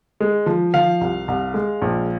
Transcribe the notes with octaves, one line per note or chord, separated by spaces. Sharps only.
G#3
F3
F3 F5
C2
C2
G#3
A#1